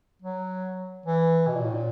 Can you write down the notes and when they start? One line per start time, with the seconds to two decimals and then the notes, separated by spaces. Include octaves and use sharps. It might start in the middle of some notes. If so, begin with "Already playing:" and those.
0.22 F#3
1.06 E3
1.47 B2
1.56 A#2
1.65 A2
1.74 A#2